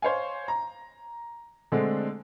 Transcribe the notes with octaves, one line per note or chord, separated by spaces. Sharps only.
C5 C#5 F5 G#5
A#5
D3 G#3 A3 C4 D4